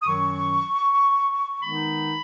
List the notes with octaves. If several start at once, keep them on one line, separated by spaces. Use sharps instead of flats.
D#6
F#2 D#3 F#3 C#4 C#6
D#3 G#3 B3 D#4 B5